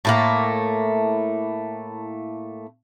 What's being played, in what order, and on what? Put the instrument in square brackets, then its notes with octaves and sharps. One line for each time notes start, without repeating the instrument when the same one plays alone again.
[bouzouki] A2 A3 A#3